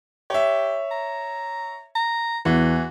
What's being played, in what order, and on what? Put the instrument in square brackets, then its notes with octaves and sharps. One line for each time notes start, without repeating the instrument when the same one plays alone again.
[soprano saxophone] G4 [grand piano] C#5 E5
[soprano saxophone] A#5
A#5
[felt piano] E2 [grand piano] E3 [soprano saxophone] F#4